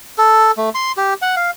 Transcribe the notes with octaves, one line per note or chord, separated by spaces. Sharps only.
A4
A3
C6
G4
F#5
F5